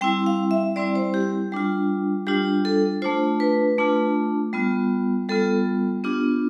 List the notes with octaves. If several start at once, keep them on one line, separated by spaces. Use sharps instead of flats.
G3 C4 E4 G5
F5
E5
G3 C4 E4 D5
C5
G4
G3 D4 F4
G3 D4 F4 G4
A4
A3 D4 F4 C5
B4
A3 D4 F4
G3 B3 F4
G3 B3 F4 A4
B3 D4 F4 G4